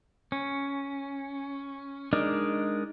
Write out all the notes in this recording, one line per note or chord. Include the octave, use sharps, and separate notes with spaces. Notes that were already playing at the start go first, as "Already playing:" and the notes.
C#4
G#3 D4 D#4 A#4 D5